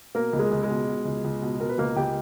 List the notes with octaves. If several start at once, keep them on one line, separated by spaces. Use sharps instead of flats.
B2 A#3 A#4
C#2
G#3 G#4
C#2
G#3 G#4
B2
B2
C#2
C#2
B2
B2 A#4
B4
C#2 A#3 A#4
C#2 G4 G5